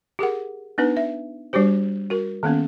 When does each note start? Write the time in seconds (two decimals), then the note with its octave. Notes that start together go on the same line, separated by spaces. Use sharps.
0.19 G4 G#4 A#4 F#5
0.78 B3 D4 D#4 B4
0.97 E5
1.53 G3 D4 F#4 G4 C5
2.10 F#4 A#4
2.43 D#3 A#3 B3 C#4